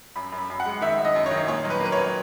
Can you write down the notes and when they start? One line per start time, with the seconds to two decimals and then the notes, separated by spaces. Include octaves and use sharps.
0.16 F#2 B5
0.32 F#2
0.38 B5
0.50 F#2
0.60 F#5
0.66 G#3
0.81 D#3 E5
0.98 F#2
1.05 D#5
1.15 F#2
1.26 C#5
1.31 D#3
1.48 A#2 C#5
1.65 F#3
1.70 B4
1.81 A#3 B4
1.92 F#3 C#5